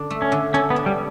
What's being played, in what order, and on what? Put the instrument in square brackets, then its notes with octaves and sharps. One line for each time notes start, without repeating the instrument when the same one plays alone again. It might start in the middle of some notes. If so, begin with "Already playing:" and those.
Already playing: [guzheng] D3 D4
A3
[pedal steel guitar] C#4
[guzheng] D3
[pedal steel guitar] C#4 [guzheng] A4
[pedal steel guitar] B3
[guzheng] D4
[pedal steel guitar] G3